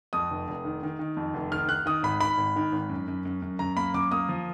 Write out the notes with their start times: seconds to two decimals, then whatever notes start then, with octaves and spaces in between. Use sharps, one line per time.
0.13 F2 D#6
0.30 F1
0.48 F1
0.65 D#3
0.83 D#3
0.99 D#3
1.17 F2
1.34 F1
1.51 D#3 F6
1.69 D#3 F#6
1.86 D#3 D#6
2.03 G#1 B5
2.20 D#3 B5
2.38 G#1
2.56 D#3
2.72 G#1
2.90 F#2
3.08 F#2
3.25 F#2
3.42 F#2
3.59 F#2 A#5
3.76 A#3 B5
3.94 F#2 D6
4.11 A#3 D#6
4.29 F3